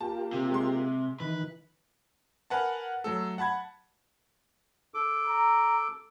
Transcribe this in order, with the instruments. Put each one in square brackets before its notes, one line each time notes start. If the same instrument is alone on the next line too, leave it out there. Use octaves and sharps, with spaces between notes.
[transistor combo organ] A#3 F4 G4 [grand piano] A5
[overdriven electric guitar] C3
[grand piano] G#3 C6
[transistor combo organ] D#3 E3 [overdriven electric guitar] B4
[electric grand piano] A#4 B4 F#5 G#5 A5
F#3 A3 A4
F#5 A5 B5 G#6
[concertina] A4 D6
[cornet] A#5